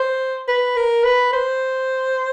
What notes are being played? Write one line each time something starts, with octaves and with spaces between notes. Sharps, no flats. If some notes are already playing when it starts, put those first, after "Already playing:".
Already playing: C5
B4
A#4
B4
C5